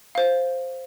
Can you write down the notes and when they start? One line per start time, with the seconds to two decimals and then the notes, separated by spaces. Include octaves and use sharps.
0.15 C5 F5